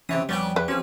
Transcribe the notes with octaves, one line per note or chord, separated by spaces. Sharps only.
C3 E3 C#4 C#5 E5 D#6
F2 G3 B3 C#4 B4 G5
E2 B4
F3 C4 C#4 G4 G#4 C#5